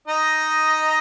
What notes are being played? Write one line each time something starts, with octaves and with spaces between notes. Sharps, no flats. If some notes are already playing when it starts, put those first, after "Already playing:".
D#4 D#5